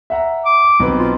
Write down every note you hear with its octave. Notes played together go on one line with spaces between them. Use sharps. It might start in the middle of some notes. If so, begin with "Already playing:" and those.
E5 F#5 A#5
D6
B1 C4 B4
F4